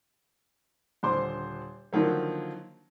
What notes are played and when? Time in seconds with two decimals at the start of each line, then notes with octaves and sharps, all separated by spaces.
1.03 D#1 D3 C5 C6 D6
1.93 D3 D#3 F3 F#3 A#3